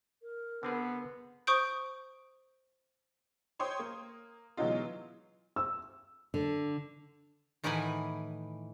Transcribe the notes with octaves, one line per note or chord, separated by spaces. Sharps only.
A#4
D3 B3 C4 G#4
C5 C#6 D#6 G6 D7
C5 C#5 G5 C6 D#6
A#3
B2 E3 F#3 G#3 D#4 F4
E6
D3
A2 D#3 E3 B4 F#5 G#5